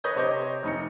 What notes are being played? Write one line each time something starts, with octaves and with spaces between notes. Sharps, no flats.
B4 C#5 B5 D#6 G6 A#6
C3 C5 C#5 D#5 D6 G6
F1 D#4 C#7